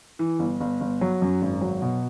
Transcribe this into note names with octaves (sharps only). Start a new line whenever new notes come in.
E3
G1
G1
G1
F#3
F#2
G#1
F#3
B2